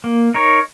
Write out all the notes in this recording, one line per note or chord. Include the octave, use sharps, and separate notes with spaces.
A#3
D#4 A#4 C#5